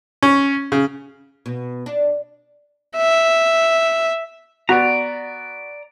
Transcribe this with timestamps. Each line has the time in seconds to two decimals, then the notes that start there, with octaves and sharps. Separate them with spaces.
0.23 C#4
0.72 C#3
1.46 B2
1.86 D4
2.97 E5
4.69 B3 F#4 D5 A#5